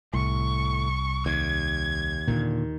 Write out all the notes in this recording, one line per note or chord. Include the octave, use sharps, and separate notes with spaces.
C2 A2 C#6
D#2 G#6
D#2 A#2 D3 D#3